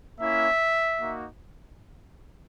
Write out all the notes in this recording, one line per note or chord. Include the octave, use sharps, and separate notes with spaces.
A#3 C#4 E4 E5
A#3 D#4 F#4